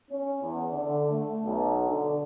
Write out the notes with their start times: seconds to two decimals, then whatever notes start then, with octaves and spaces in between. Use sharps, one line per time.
0.11 C#4
0.42 E2
0.72 D3
1.09 A3
1.45 B1
1.87 D3